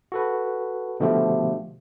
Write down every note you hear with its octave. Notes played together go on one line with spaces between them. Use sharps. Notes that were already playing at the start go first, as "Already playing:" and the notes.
F#4 A4 B4
B2 D3 F3 A3 G4